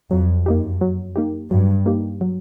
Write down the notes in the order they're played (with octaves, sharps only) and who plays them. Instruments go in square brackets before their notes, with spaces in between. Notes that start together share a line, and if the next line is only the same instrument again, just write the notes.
[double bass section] F2 [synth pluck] F#3
[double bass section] F#2 [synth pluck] A#3 D#4 G4
[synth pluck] F#3
A#3 D#4 G4
[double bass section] G2 [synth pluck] F#3
[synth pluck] A#3 D#4 G4
F#3